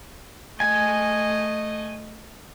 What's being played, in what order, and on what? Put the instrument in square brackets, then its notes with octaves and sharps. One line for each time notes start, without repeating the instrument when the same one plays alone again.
[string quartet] A3 D#5 [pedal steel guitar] G#5